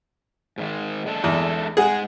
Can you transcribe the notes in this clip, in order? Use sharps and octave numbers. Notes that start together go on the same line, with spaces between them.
G#2 D#3 G#3
G#3 D4 A4
E2
G#2 G#3 G#4 F#5